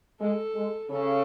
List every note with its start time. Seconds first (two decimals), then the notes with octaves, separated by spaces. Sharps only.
0.20 G#3 A4
0.55 G#3
0.90 C#3 A4